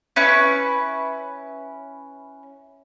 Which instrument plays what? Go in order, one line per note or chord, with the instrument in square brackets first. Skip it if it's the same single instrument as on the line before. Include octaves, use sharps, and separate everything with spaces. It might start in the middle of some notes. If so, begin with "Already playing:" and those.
[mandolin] C#4 E4 B4 C#6